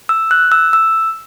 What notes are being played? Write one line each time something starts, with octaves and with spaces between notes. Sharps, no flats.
E6
F#6
E6
E6